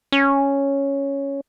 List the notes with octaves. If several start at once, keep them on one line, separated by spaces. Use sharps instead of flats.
C#4